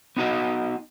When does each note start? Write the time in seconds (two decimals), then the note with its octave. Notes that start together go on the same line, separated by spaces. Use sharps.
0.17 B3 D#4 F#4 D#5